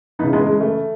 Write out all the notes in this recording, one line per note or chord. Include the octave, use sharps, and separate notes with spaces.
C#3 E3 B3 D#4
G#3 B3
G#3
A3